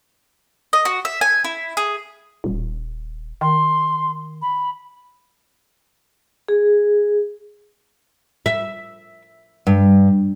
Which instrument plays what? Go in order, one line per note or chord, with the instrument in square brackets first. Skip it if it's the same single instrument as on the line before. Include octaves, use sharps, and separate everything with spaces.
[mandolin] D#5
F#4
E5
G#5
E4
G#4
[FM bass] D#1
[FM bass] D#3 [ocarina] C6
[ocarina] B5
[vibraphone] G#4
[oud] E5
G2